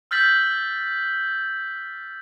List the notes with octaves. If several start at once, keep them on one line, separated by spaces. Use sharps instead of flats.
E6 F6 G6 A6 B6 F#7